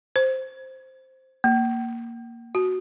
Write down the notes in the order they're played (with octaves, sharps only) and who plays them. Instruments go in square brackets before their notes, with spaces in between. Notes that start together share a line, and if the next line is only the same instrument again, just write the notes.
[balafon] C5
A#3
F#4